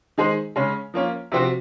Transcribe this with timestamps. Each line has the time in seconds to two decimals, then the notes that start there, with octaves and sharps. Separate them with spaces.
0.18 D#3 G#3 D#4 G#4 C5
0.56 C#3 G#3 C#4
0.94 F3 A#3 C#4
1.32 C3 F3 C4 F#4